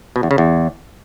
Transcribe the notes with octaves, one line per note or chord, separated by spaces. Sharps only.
B2
E2
C#3
E2